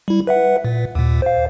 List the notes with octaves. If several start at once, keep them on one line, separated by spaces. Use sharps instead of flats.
G3 E4
B4 E5 F#5
A#2
D#2 A#2
C5 F5